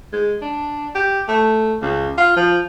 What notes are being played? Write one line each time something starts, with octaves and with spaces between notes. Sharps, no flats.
G#3
D4
G4
A3
C#2
F4
F3